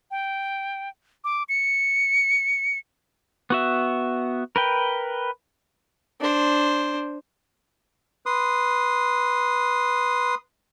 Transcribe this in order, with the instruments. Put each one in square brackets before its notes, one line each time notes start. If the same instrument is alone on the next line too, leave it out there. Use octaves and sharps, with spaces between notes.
[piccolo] G5
D6
C#7
[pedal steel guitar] B3 F#4 E5
A#4 B4 G5
[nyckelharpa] D4 C5
[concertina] B4 C6 D#6